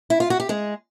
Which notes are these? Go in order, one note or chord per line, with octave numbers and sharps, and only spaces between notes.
E4
F4
F#4
G4
G#3 G#4